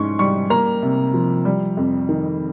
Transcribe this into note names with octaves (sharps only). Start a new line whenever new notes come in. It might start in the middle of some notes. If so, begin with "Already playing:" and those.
Already playing: G#2 C#4 C6 C#6
G3 C#6
A#3 A#5
C3
F3
G3
F2
D#3